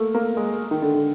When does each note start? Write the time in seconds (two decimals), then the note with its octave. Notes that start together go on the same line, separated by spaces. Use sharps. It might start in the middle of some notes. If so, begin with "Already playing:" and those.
Already playing: A3 A#3
0.15 A#3
0.37 G#3
0.71 D#3
0.82 D3
0.94 D3